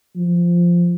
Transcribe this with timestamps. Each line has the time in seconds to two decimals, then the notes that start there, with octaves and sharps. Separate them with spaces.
0.15 F3